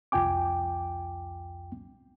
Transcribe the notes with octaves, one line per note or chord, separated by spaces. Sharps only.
C2 F2 F4 G5 G#5 D6